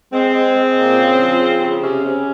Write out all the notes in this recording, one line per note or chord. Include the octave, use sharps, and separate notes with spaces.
G#3 C4
G#3
G#3
A#2
C#3
F3
C#3
C#3
C3 C#4
C3